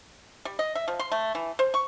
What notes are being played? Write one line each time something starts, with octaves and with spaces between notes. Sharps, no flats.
G3
D#5
E5
F3
C6
A3
E3
C5
C#6